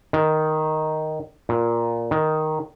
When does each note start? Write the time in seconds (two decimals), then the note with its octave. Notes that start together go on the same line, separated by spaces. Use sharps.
0.13 D#3
1.49 A#2
2.11 D#3